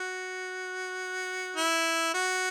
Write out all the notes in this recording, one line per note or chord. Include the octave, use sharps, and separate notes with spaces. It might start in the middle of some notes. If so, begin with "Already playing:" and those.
Already playing: F#4
E4
F#4